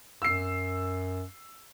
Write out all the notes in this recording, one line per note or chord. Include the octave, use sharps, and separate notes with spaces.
F#2 E6 C7